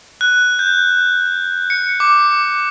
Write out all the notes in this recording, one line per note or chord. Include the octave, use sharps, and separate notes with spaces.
F#6
G6
C#7
D6